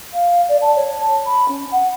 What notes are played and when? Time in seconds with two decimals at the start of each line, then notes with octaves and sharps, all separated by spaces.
0.13 F5
0.48 D5
0.61 A5
0.75 C#5
1.00 A5
1.25 B5
1.48 C#4
1.71 F#5